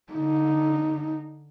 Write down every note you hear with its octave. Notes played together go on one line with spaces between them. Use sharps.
D3 D#4